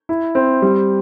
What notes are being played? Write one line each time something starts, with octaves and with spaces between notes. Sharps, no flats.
E4
C4
G3